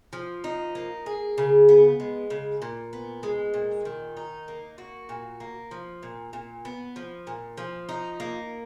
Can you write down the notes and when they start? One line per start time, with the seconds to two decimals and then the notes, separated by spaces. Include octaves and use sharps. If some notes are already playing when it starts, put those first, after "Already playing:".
0.13 F3
0.44 D#4
0.75 A#3
1.06 G#4
1.38 C#3
1.69 B3
2.00 G#3
2.30 C#3
2.62 A#2
2.93 B3
3.23 G#3
3.54 A#2
3.85 D#3
4.17 D#4
4.48 A#3
4.78 F#4
5.09 A#2
5.40 A#3
5.71 F3
6.03 A#2
6.33 A#2
6.65 B3
6.96 F3
7.27 A#2
7.58 F3
7.89 D#4
8.20 A#3